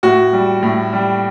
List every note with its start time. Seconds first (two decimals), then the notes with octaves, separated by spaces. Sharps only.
0.03 A2 F#4
0.33 G3
0.62 A2
0.93 G3